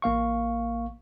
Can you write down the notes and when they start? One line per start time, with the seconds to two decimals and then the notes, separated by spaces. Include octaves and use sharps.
0.02 A1 A#3 F5 C#6